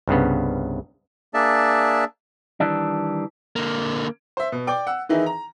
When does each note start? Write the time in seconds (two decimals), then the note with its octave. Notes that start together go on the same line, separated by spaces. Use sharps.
0.08 C2 G2 C#3 B3
1.34 A#3 D4 G#4 D5 E5 A5
2.60 D#3 E3 G3 D4
3.56 D3 A#3
4.37 C5 E5
4.52 B2
4.67 D5 G5 D6
4.87 F#5 E6
5.09 D#3 E3 D#4 E4 G#4
5.26 A#5